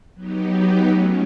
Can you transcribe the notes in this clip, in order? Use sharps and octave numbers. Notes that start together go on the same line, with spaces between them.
F#3 B3 D#4 G4
F#3 A3 C#4